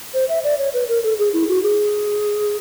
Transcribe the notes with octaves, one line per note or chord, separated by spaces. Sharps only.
C5
E5
D5
C#5
B4
A#4
A4
G#4
E4
F#4
G#4